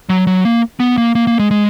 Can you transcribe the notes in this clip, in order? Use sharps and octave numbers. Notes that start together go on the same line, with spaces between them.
F#3
F#3
A#3
B3
A#3
A#3
A#3
G#3
G#3